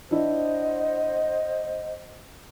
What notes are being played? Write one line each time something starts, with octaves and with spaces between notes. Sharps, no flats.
D4 E4 C5 D#5 F#5